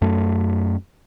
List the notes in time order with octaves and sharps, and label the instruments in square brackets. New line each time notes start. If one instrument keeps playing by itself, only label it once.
[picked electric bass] F#2 A3